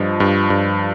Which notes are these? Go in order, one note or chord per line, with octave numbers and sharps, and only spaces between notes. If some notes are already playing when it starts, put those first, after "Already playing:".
Already playing: G2 F3 D#5
G2
G2